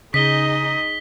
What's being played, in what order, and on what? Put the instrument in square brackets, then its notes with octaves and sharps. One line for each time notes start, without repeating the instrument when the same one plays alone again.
[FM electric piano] C#3 [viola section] D#4 G#4 [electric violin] D#5 [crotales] B6 G7